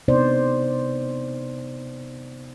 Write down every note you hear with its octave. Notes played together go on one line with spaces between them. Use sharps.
C3 B3 D#4 C5 D5